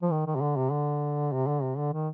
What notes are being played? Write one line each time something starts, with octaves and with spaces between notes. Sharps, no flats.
F3
D#3
D#3
C3
D3
C3
D3
C3
D3
C3
D3
D#3